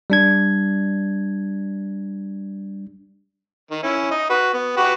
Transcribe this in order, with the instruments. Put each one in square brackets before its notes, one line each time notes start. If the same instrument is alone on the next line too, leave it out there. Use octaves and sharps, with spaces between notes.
[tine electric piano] G3 D4 G#6
[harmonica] D#3
C#4 E4
D#4 D#5
F#4 B4
B3
F#4 G4 B4